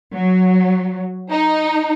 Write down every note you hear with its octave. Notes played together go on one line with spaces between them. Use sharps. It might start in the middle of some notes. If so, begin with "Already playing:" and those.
F#3
D#4